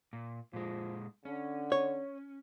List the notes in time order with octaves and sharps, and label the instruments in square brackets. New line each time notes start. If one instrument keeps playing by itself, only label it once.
[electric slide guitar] A#2
[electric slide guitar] A#2 G#3 [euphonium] F3
[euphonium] D3 [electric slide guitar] C#4
[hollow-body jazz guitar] C#5